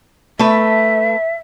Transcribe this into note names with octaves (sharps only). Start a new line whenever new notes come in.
A3 B4 E5